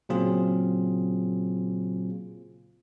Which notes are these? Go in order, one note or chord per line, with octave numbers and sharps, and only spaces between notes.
A#2 C#3 F#3 C4 F4 G#4